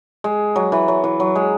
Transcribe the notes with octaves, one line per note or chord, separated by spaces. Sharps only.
G#3
F#3
E3
F#3
E3
F#3
G#3